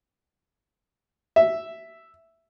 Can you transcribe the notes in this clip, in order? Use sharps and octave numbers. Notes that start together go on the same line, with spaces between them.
E5